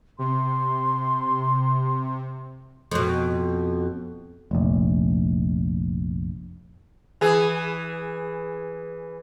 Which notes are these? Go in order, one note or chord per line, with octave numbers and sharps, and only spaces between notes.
C3 C6
F2 B2
F1 A#1
E3 G#4